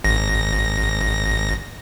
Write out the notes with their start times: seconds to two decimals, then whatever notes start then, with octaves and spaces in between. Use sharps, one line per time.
0.04 G#1 A#6